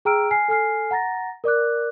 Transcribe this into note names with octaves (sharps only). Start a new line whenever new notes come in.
G#4 G5 A#5 E6 F6 D7
G#5 F6 C7
A4 G#5 F6 C7
F#5 A#5 A6 A#6
A#4 D5 D6 F#6